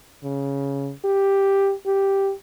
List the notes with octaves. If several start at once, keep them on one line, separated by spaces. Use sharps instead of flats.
C#3
G4
G4